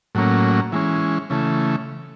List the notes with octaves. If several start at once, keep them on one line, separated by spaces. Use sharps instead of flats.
A2 F#3 A#3 C#4
E3 G#3 C#4
C#3 E3 A3